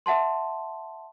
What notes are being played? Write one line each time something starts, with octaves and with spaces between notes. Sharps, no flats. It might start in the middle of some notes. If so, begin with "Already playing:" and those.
E5 F#5 A5 C6